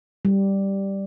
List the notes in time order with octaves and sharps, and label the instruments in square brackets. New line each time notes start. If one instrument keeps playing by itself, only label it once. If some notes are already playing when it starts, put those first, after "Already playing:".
[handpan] G3